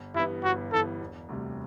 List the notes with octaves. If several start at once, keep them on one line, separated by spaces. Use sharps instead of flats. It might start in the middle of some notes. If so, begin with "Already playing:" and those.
Already playing: G1
G2 E3 B3 E4
G1 F#4
G2 E3 B3 A4
E1
D2 C3 G3